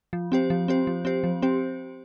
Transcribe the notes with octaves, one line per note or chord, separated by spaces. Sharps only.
F3
C4 G4 C5
F3
C4 G4 C5
F3
C4 G4 C5
F3
C4 G4 C5